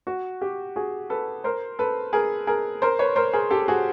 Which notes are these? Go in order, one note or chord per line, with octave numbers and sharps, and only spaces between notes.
F#4
G4
F#4 G#4
A4 B4
A#4 C5
A4 B4
G#4 A#4
G#4 A#4
A#4 C5
B4 C#5
A#4 C5
G#4 A#4
G4 A4
F#4 G#4